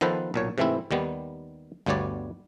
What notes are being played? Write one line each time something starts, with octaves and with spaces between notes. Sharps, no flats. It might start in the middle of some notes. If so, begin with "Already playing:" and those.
D#3 F3 B3 A4 B4 C5
B1 A#2 C#5
G#2 C3 E3 A3 C4 E4
D#2 D#3 G3 B3
G1 D2 G3 B3 C#5 D5